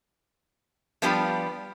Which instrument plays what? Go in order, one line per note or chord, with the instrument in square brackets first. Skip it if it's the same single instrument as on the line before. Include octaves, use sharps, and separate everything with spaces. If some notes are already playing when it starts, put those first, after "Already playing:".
[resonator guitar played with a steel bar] F3 G3 B3 D4 F4 G4